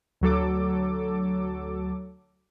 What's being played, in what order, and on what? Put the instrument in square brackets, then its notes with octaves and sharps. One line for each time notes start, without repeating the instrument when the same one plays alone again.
[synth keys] D2 F#3 A4 D6